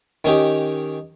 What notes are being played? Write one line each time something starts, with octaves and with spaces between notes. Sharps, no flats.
D#3 C#4 D#4 G4